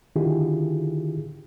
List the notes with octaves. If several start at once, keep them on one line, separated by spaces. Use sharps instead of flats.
D3 D#3 E4 F4 G4 G#4